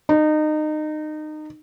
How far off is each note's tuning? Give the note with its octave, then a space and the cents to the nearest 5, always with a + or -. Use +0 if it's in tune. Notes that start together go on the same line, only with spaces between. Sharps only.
D#4 -25